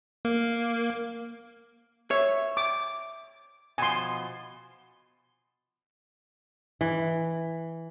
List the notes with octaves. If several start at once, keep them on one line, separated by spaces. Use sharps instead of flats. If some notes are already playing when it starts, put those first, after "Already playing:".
A#3
C#5 E5
D6
B2 F3 G#5 C6
E3